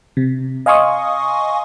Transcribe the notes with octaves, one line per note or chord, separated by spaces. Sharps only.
C3
D#5 F5 G#5 C6 C#6 D#6